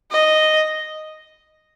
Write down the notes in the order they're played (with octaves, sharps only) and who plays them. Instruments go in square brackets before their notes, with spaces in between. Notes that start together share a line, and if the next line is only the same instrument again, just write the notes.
[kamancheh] D#5